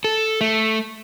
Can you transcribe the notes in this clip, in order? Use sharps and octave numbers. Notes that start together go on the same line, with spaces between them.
A4
A3